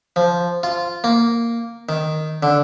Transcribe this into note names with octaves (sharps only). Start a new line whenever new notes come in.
F3
F4
A#3
D#3
D3